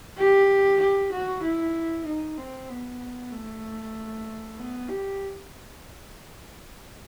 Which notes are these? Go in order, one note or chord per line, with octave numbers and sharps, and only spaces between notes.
G4
G4
F#4
E4
D#4
C4
B3
A3
B3
G4